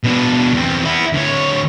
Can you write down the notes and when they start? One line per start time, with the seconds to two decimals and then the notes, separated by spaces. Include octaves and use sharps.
0.04 B2 D4
0.54 E2 C4
0.85 B3 E4
1.14 D2 C#5